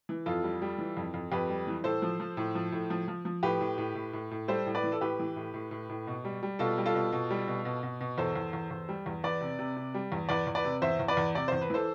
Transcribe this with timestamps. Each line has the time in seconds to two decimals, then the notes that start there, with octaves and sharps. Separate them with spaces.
0.09 E3
0.26 F2 F4 A4
0.44 G3
0.62 G3
0.78 E3
0.97 F2
1.14 F2
1.31 F2 G4 B4
1.49 G3
1.67 E3
1.84 A2 A4 C5
2.02 F3
2.20 F3
2.37 A2
2.55 F3
2.72 A2
2.90 F3
3.08 F3
3.25 F3
3.43 A2 G4 B4
3.61 A2
3.78 A2
3.95 A2
4.13 A2
4.31 A2
4.48 G3 A4 C5
4.66 A2
4.75 B4 D5
4.84 E3
4.92 A4
5.01 A2 G4 B4
5.19 E3
5.36 A2
5.54 A2
5.71 A2
5.89 A2
6.07 B2
6.25 G3
6.43 G3
6.59 B2 F4 A4
6.78 G3
6.86 F4 A4
6.95 B2
7.12 B2
7.31 G3
7.47 B2
7.65 B2
7.83 B2
8.01 B2
8.18 E2 A4 C5
8.36 E2
8.53 E2
8.71 E2
8.89 G3
9.06 E2
9.24 E2 B4 D5
9.41 C3
9.59 C3
9.76 C3
9.94 G3
10.12 E2
10.29 E2 B4 D5
10.47 E2
10.55 B4 D5
10.64 C3
10.82 E2 C5 E5
10.99 E2
11.08 B4 D5
11.17 E2
11.35 C3 D5
11.48 E2 C5
11.61 B4
11.70 E3 A4 C5